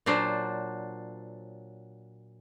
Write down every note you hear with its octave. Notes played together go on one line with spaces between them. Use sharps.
A#2 F#3 D4 C5